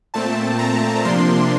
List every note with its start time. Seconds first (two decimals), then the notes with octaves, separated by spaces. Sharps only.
0.14 A#2 A3 C4 A5
0.59 A#5
1.05 C3 F3 A#3 D4 C6